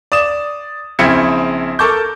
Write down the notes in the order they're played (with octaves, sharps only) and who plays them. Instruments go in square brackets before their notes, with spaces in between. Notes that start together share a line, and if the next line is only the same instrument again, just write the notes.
[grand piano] D5 D#6 E7
A#1 C#3 C4 E4 G#6 C#7
A4 A#4 A5 C#6 D6 G6